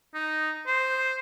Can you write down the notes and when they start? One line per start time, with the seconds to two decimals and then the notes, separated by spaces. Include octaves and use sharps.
0.14 D#4
0.67 C5